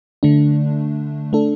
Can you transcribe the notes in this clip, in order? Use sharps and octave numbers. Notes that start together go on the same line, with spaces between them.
D3 A3 D4
A3 D4 A4